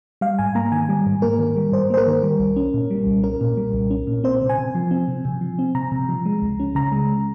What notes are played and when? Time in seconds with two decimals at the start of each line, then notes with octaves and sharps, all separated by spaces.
0.21 G3 F5
0.39 G#2 G#5
0.55 A#3 A#5
0.72 D#3 G#5
0.89 G3
1.06 G#2
1.22 A#3 A#4
1.39 D#3
1.56 G3
1.72 G#2 C5
1.90 A#3 C5
1.97 A#4
2.07 D#3
2.23 G3
2.39 C2
2.56 C#4
2.74 A#2
2.91 G3
3.07 C2
3.23 C#4 A#4
3.41 A#2
3.57 G3
3.74 C2
3.91 C#4
4.07 A#2
4.24 C4 C5
4.42 C3
4.49 G#5
4.58 C3
4.75 F3
4.91 C4
5.08 C3
5.25 C3
5.41 F3
5.59 C4
5.75 C3 A#5
5.92 C3
6.09 F3
6.25 G#3
6.42 C#2
6.60 C#4
6.75 C#3 A#5
6.92 G#3